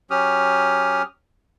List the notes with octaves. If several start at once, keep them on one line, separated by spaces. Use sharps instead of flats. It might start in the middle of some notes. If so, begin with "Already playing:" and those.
F#3 C#4 G4 D#6 F6